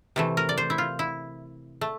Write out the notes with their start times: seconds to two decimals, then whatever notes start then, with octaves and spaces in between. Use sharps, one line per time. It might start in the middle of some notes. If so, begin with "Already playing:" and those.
0.16 C3 E3 A3
0.37 A#4
0.49 D5
0.58 C5
0.70 E4
0.78 F4
0.99 E4
1.81 A3